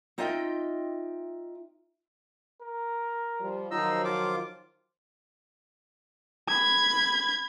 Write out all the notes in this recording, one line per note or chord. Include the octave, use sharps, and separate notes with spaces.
C4 D#4 F4 D#5 E5 G5
A#4
F3 G3
D#3 F3 F#3 D#4 C5 D#5 E6
F4 D6
B5 G#6